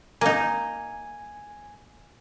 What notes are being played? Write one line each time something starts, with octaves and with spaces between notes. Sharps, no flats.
A#3 D#4 G#5